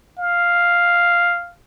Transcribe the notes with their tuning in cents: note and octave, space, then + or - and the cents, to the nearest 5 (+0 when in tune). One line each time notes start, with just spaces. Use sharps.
F5 +0